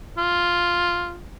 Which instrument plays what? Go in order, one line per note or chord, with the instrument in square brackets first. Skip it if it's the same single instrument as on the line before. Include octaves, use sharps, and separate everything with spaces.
[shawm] F4